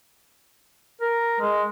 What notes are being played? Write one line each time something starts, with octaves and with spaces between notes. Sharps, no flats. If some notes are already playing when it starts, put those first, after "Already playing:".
A#4
G#3